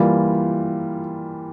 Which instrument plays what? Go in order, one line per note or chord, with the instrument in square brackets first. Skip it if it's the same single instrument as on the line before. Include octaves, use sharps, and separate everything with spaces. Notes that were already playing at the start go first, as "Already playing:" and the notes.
Already playing: [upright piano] E3 G3 A#3 F4